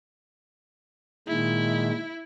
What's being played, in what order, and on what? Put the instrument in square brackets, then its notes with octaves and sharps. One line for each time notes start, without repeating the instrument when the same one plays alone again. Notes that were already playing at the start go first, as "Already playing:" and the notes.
[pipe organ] A#2 D#3 G#3 [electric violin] E4